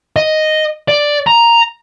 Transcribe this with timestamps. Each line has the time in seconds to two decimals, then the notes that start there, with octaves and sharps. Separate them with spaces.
0.16 D#5
0.89 D5
1.27 A#5